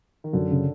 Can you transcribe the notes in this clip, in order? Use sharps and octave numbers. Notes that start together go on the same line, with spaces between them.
D#3
F#2 D3
C#3